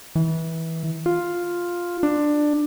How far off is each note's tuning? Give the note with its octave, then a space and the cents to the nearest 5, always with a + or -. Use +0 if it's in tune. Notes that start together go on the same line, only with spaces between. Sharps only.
E3 -20
F4 +5
D4 +15